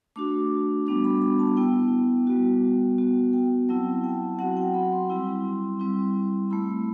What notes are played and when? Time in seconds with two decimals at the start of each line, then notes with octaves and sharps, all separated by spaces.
0.16 A3 D4 F#4 D6
0.86 G3 B3 D4 F#4 D6
1.04 B5
1.22 B5
1.39 A5
1.57 B3 E4 G5
2.27 G3 B3 F#4
2.98 B3 F#4
3.33 G5
3.69 F#3 C4 E4 A5
4.04 G5
4.39 F#3 C4 F#4 F#5
4.57 G5
4.74 B5
4.93 C6
5.10 G3 C4 E4
5.80 G3 C4 E4
6.50 A3 E4 B5